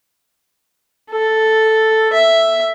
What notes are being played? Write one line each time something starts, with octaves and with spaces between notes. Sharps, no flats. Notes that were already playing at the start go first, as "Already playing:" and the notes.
A4
E5